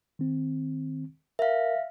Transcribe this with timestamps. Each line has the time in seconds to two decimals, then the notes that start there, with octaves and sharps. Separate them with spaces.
0.19 D#3 C4
1.39 A#4 E5 F5